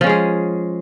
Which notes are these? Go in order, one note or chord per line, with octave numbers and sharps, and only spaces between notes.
F3 G#3 C#4 G#4